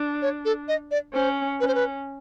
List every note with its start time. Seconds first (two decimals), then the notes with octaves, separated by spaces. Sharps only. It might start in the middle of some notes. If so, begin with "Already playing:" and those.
Already playing: D4
0.22 C#5
0.45 A4
0.68 D#5
0.91 D5
1.14 C#4 C5
1.60 C#4 B4
1.68 C5
1.75 B4